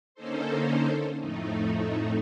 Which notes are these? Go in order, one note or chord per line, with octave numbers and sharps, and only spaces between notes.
D3 A#3 C#4 D#4 A4 C5
F2 A2 A3 D#4